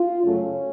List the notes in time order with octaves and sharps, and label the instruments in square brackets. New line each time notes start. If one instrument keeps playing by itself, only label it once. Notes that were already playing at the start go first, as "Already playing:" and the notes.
Already playing: [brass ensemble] F4
F#2 C#3 F#3 A3 C#4